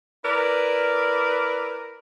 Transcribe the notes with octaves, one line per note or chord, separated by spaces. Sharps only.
E4 A#4 B4 D5